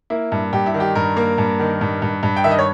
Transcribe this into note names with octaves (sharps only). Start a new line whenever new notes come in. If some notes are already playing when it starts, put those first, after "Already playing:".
A#3 E4
G2
G2 G4
E4
D#3
G4
G2 A#4
A#3
G2
D#3
G2
G2
G2
G5
D#3 E5
D#5
C#5